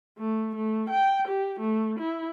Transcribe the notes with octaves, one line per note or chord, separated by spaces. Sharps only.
A3
A3
G5
G4
A3
E4